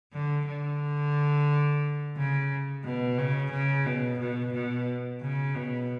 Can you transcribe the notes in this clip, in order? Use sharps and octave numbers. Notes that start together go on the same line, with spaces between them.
D3
D3
C#3
B2
C#3
C#3
B2
B2
B2
C#3
B2